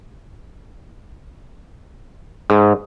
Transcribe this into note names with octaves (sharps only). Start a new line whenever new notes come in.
G#2